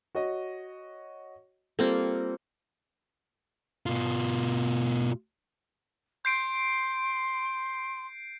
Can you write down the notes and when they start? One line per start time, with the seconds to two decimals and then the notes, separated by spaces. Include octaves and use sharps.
0.15 F#4 C#5 D#5
1.79 G3 A#3 C4 F4 A4
3.86 B2 F4
6.25 C6 G6 C7 D7